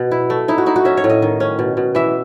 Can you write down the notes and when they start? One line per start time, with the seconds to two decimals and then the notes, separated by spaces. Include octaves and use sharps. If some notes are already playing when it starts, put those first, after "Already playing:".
Already playing: B2
0.11 E4
0.30 A3
0.48 D#4 E4
0.58 F#4
0.66 D#4 E4
0.76 F#4
0.85 C#4 E5
0.97 C#5
1.04 A2
1.10 D#5
1.22 D#3
1.40 C#4
1.59 B2
1.77 B2
1.95 E3 E5